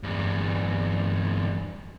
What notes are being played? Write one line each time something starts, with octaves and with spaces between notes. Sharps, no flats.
E2 G2